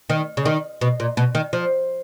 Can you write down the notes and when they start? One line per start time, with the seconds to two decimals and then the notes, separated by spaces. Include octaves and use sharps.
0.10 D#3
0.37 C#3
0.46 D#3
0.81 B2
1.00 A#2
1.17 B2
1.35 D#3
1.53 F3